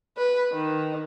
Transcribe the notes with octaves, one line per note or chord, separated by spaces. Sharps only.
B4
D#3